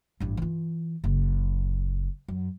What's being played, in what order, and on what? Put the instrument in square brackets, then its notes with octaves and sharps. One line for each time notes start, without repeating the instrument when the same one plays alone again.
[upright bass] A1 G2
E3 F4
F#1 C#3
F#2